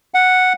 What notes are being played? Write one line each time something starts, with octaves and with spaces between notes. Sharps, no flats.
F#5